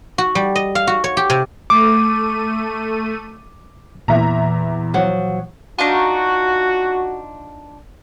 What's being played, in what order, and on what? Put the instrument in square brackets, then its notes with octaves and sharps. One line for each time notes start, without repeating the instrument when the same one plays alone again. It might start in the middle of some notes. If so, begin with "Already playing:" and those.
[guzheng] F#4
G3
D#5
F5
F#4
C#5
G4
C3
[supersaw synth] A3 D#7 [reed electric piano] D6
[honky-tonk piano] E2 E5 A#5 [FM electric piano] A#2 E3
[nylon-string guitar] F3 F#3 F#5
[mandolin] D4 D#4 F4 [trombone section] F#4